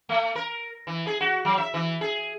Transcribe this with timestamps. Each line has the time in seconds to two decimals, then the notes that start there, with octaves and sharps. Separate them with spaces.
0.09 A3
0.36 A#4
0.87 E3
1.07 G#4
1.21 F#4
1.45 F#3
1.58 E5
1.74 E3
2.01 G#4